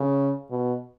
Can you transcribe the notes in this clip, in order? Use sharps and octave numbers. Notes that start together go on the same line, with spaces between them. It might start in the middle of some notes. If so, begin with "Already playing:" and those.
Already playing: C#3
B2